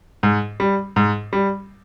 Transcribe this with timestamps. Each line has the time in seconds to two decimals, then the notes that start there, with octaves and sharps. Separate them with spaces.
0.23 G#2
0.60 G3
0.96 G#2
1.33 G3